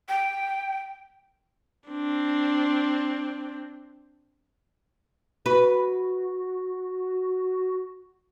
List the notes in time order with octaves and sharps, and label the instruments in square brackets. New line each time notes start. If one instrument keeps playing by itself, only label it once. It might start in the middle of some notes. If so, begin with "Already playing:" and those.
[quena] G5
[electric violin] C4 D4
[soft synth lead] F#4 [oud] B4